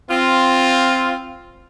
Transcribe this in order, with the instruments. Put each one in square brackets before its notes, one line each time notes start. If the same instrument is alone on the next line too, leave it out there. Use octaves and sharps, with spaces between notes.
[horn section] C4 F4